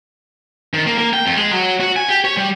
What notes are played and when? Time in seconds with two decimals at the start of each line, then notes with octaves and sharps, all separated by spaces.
0.74 D#3
0.86 A#3
0.98 A#3
1.13 G5
1.26 F2
1.37 G#3
1.53 F#3
1.80 F#4
1.96 G#5
2.09 G4
2.25 C#5
2.37 G3